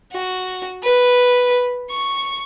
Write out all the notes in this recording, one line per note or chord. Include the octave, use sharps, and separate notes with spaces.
F#4
B4
C#6